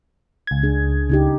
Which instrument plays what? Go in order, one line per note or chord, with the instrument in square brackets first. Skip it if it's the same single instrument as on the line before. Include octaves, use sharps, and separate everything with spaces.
[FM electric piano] C#2 G#6
[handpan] D4 G#4
C#3 D#4 G4